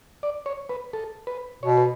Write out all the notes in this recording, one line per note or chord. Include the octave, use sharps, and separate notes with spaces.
D5
C#5
B4
A4
B4
B2 C#5
B4